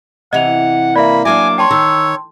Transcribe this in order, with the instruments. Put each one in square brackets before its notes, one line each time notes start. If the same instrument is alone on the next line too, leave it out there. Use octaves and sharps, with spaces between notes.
[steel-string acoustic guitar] C3 E3 [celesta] D#5 F7 [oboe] F#5
[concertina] A#3 [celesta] D5 E5 [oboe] B5
[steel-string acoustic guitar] F#3 A#3 D4 [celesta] E5 [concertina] G#5 [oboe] D6
[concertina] C#5 [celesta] G5 A5 C6
[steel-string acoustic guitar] D#3 [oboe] E6